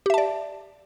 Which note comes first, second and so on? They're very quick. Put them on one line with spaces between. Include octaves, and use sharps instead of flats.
G4 E5 A5 D5